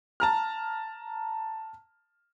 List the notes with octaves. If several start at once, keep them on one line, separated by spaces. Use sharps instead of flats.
A5 A#5 F6